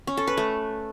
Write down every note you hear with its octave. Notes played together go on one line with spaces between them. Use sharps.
C#4
A4
B4
A3